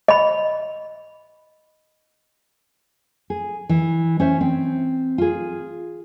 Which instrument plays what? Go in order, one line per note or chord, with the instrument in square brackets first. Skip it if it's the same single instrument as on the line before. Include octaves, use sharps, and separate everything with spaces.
[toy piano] D#5 B5
[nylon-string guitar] G#4
E3
C#4 C5 E5
C4
F4 G#4